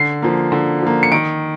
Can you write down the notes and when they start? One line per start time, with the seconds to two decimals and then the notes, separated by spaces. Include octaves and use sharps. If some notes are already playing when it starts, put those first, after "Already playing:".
Already playing: D3 C7
0.22 F3 A#3
0.52 D3
0.82 F3 A#3
1.03 C#7
1.12 D#3 D7